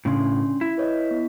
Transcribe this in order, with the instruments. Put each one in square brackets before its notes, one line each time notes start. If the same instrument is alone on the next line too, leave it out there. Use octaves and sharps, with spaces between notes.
[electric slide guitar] A2 C#3 [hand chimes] C#4 D4 C6
[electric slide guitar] E4
[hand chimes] B4 C#5 D#5
B3